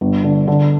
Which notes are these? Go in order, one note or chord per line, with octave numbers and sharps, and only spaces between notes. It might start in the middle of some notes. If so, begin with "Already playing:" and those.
G1
D3
D3